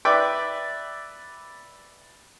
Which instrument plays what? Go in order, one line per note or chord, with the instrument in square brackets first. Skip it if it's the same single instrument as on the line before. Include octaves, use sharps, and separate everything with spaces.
[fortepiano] B4 D5 E5 G5